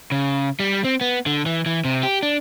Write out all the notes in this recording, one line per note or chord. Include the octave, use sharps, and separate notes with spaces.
C#3
G3
C4
B3
D3
E3
E3
C3
G4
D4